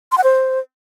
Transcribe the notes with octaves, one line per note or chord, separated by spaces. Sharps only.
C6
F#5
C5